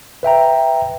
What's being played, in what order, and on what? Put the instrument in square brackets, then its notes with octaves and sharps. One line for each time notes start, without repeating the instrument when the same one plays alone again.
[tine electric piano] B4 E5 G5 A#5